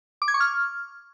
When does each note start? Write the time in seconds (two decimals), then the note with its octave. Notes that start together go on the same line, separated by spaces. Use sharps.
0.22 D6
0.28 G#6
0.34 C#6
0.40 F6